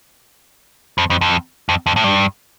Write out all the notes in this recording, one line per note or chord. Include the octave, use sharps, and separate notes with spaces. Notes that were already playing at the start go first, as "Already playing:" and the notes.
F2
F2
F2
F2
F2
A2
G2